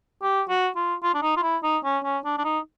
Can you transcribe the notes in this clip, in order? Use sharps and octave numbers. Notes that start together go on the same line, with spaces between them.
G4
F#4
F4
F4
D4
D#4
F4
E4
D#4
C#4
C#4
D4
D4
D#4